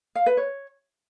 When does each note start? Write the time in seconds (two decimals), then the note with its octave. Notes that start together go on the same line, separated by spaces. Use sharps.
0.15 F5
0.26 B4
0.37 C#5